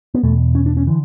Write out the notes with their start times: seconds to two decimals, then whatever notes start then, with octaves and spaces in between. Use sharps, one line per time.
0.14 B3
0.23 E2 B2 A3
0.55 C#4
0.66 D4
0.77 C#4
0.87 D3 E3